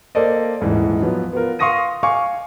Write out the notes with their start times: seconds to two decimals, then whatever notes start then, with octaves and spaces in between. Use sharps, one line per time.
0.15 A#3 A4 C5 D5 D#5
0.61 D#1 G#2 E3
1.02 F3 F#3 B3
1.33 B3 F4 A#4
1.59 F5 C6 C#6 D#6 A#6 D#7
2.03 F5 G#5 C#6 D6